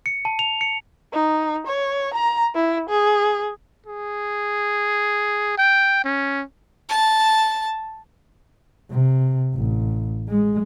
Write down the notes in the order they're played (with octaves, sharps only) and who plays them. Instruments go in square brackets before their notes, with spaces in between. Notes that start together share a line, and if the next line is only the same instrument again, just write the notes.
[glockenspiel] C#7
A5
F7
C#7
[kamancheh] D#4
C#5
A#5
E4
G#4
[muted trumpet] G#4
G5
C#4
[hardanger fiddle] A5
[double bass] C3
A1
G#3